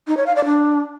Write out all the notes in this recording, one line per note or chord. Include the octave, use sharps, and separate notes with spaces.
D#4
C#5
F5
D5
D4